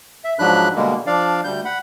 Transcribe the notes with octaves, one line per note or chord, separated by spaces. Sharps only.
E5
G#2 F3 F#3 D4 B5 F#6
B2 D3 G3 G#3 A#3
F3 D4 D5 F5
D2 G3 G6
F#5 B5